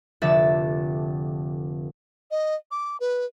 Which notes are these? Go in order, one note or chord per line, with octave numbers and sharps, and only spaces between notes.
F1 D3 D4 E5 A6
D#5
D6
B4